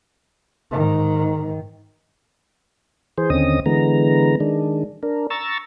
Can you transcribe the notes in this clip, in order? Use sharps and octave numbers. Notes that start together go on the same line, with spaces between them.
G#2 D#3
E3 G#4 C5
D#2 D3 C4 C#4 D#5 D#6
D3 E3 G#3 B3 A#5
D#3 G#3 D4
D4 A#4
A#5 C#6 E6 A6